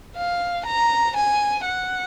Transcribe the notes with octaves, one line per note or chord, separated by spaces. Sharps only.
F5
A#5
G#5
F#5